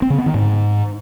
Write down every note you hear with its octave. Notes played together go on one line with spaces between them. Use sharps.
C4
C#3
B3
D#3
G#2